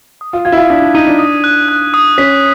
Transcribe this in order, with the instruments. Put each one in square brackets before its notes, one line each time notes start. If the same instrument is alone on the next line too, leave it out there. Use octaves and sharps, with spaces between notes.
[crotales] D#6
[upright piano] F4
[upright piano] F4 [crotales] G#6
[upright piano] E4
F4
[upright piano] D4 [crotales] B6
[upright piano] D4
[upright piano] D#4 [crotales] D#7
[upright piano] D4
[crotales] D#6
F#6
F#6
D#6
[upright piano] C#4 [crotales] B6